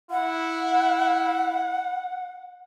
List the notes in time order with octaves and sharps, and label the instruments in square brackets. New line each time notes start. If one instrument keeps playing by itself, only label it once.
[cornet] E4 [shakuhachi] F#5